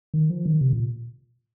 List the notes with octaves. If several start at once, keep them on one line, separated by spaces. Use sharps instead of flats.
D#3
F3
D#3
C3
A#2